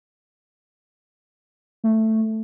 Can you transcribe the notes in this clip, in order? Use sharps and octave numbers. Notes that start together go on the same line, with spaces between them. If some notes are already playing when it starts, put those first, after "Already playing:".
A3